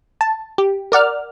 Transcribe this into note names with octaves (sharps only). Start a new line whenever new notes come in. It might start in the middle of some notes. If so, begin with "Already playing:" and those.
A5
G4
A#4 D5 F#5 F6